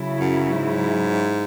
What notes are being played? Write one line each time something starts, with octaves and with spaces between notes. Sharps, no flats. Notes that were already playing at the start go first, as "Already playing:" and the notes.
Already playing: C#3 F#3 E4
F#2
G#2